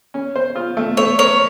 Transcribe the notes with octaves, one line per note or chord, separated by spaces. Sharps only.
C#4
C5
F4
A3
A3 C#5
A#4 C#5